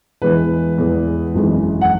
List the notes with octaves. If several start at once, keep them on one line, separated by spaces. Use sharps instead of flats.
E2 E3 G#3 B4
E2 E3 G#3
G#1 F#2 E3 G#3
F#5